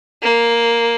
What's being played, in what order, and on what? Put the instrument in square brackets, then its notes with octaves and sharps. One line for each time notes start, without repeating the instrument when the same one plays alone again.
[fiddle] A#3